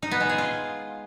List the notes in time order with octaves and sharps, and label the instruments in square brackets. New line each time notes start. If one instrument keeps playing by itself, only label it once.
[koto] D#4
B3
G#3
G#4
F4